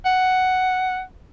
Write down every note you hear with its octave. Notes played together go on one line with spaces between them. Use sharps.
F#5